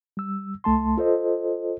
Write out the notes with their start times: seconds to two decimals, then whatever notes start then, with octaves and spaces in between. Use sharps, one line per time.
0.17 G3 E6
0.64 C2 A3 A5 C6
0.97 F4 A4 C5 D#5